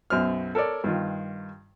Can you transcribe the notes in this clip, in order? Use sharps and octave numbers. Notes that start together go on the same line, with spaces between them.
B1 F#2 C5 F6
A4 A#4 C#5 D5
G2 D#3 F4